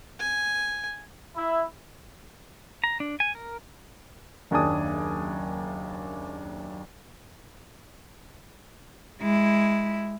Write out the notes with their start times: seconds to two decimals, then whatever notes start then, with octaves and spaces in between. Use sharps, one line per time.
0.20 G#5
1.36 E4
2.84 A#5
3.00 D4
3.20 G#5
3.35 A#4
4.51 F#1 D#2 D4 G#5 A5 D#6
9.21 G#3 E4